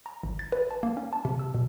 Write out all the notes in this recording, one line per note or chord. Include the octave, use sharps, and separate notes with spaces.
A#5
G#1
A6
B4
A5
A#3
C#4
A5
C3
E6
B2